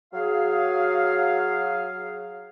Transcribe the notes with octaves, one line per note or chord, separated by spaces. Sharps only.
F#3 G#4 F5